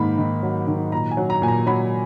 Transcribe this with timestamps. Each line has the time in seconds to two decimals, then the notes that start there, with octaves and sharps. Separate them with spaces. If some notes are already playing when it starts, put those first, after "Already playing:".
Already playing: G#2 D#3 A#3 B5
0.18 D#3
0.42 F#3
0.67 D#3
0.92 A#2 A#5
1.11 G#5
1.17 F#3
1.30 A#5
1.42 A#2 G#5
1.48 A#5
1.66 F#3 B5